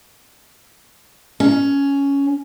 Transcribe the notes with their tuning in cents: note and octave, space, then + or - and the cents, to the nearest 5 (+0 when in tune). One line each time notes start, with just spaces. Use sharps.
C#4 +10